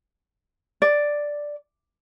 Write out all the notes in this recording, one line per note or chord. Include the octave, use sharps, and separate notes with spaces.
D5